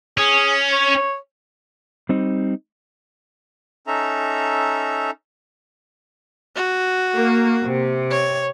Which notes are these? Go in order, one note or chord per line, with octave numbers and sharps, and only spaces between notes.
C#4 G#4
C#5
G3 C4 D#4
C#4 D#4 A4 E5 A#5
F#4
A#3
C3
C#5